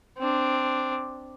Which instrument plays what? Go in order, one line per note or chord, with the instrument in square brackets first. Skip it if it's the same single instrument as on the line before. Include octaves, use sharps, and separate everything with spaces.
[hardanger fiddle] C4 D4